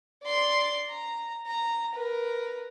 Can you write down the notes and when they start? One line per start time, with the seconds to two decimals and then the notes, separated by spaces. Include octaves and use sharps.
0.23 D5 C6
0.89 A#5
1.46 A#5
1.95 A#4 B4